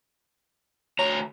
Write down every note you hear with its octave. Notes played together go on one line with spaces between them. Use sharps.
D2 C#5 A#5